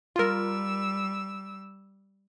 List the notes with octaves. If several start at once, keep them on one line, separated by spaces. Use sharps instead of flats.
G3 F4 A#4 E6